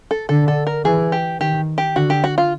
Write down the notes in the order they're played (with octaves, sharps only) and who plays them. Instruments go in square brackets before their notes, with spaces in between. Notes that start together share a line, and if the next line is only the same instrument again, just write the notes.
[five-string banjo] A4
[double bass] D3 [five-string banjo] A4
[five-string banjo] A4
A#4
[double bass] E3 [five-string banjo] G#4
[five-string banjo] G4
[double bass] D#3 [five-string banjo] G4
[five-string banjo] G4
[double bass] D3 [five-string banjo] F#4
[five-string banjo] G4
F#4
F4